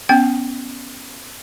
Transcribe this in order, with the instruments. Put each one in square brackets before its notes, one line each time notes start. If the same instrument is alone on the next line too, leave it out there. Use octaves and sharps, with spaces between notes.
[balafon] B3 C#4 G5